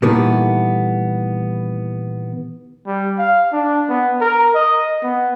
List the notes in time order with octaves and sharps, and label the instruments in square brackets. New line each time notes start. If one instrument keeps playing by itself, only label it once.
[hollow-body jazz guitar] A#2 D#3 E3 G3 A3 B3
[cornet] G3
F5
D4
B3
A#4
D#5
B3